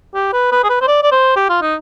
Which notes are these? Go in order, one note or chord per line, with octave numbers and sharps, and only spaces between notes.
G4
B4
B4
G#4
B4
C5
D5
D5
C5
G4
F4
D#4